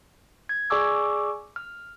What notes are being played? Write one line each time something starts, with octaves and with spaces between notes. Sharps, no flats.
G#6
G#4 D5 G#5 C#6 D6 E6
F6